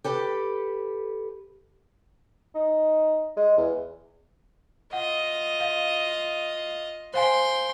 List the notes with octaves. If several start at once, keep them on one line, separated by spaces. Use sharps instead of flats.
G4 A4 B4
D#4
G#3
E2
F4 D#5 F#5
F5
C5 F5 G5 G#5 C6